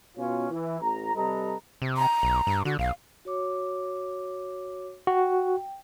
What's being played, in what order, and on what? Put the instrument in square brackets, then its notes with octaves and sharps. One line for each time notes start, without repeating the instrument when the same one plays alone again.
[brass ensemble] B2 C#4 F4
E3
A1 A#5
C3 G3 A4 B4 D#5 A#5
[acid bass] C3
[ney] A#5
[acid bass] B1
G2
[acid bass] D3 [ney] F#4
[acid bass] B1 [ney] F5
[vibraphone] F#4 C#5 D6
[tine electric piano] F#4 [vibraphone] G5